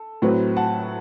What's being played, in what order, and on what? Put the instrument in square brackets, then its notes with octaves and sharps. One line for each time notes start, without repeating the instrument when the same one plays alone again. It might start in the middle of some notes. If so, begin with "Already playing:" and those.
Already playing: [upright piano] A4
A2 F#3 C4 B4
F#5 A5